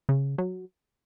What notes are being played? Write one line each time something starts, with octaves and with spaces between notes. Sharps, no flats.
C#3
F#3